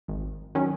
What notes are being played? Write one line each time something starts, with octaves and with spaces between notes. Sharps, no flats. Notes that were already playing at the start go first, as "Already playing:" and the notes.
G#1
D#3 F#3 C#4